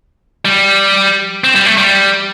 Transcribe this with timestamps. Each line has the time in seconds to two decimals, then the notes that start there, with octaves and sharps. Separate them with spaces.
0.45 G3
1.44 C4
1.56 G3
1.66 A3
1.78 G3